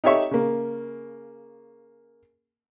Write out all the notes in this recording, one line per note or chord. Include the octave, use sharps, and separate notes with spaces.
D#4 G4 A4 C#5 E5 C#6
C#3 A#3